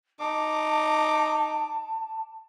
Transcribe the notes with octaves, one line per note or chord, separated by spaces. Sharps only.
D#4 A5 D6